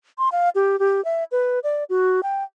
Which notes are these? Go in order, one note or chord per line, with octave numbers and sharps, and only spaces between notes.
C6
F5
G4
G4
E5
B4
D5
F#4
G5